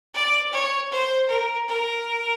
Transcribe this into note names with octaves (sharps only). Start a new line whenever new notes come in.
D5
C#5
C5
A#4
A#4